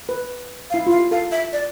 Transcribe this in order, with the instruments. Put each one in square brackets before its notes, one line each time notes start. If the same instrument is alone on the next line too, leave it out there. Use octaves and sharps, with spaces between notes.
[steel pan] B4
[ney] F5
[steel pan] E4
[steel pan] F4 [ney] F5
[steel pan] G4
[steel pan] A4 [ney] F5
[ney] E5
D5